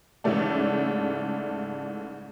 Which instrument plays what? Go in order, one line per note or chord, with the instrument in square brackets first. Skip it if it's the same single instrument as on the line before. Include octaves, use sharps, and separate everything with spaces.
[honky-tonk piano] G#2 C#3 E3 G3 A3 D4